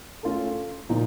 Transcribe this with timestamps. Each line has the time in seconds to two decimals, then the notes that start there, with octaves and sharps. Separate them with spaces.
0.23 A3 C#4 F4 A4
0.89 A#2 F3 A#3 D#4